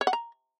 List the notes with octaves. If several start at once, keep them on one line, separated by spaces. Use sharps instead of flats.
C#5
F#5
A#5